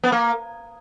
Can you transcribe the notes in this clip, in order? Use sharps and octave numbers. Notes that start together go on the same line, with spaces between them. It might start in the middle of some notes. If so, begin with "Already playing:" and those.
B3
A#3